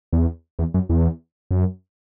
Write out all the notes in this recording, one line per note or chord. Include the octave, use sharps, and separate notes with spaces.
E2
E2
F#2
E2
F#2